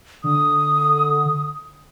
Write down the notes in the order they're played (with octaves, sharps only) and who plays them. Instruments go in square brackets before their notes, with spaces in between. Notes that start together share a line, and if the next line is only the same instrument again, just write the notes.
[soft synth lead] D3 [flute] D#6